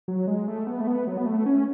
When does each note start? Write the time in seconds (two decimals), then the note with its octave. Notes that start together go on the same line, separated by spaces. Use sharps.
0.08 F#3
0.27 G#3
0.48 A3
0.67 B3
0.81 A3
0.87 B3
1.07 F#3
1.18 B3
1.26 A3
1.46 C#4